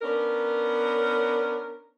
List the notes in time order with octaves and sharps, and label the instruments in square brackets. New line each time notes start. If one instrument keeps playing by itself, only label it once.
[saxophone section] B3 C#4 D4 A#4